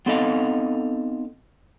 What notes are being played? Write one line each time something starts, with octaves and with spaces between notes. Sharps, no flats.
B3 C4 D#4 A4 D#5 F5